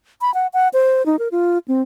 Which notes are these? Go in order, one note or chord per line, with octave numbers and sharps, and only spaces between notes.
B5
F#5
F#5
C5
D#4
A#4
F4
C4